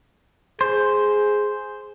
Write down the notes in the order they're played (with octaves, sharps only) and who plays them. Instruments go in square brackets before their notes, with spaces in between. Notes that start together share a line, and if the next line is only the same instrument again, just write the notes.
[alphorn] G#4 [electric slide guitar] C5